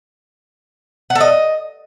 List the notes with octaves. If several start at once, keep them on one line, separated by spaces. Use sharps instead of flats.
F#5
A4
D#5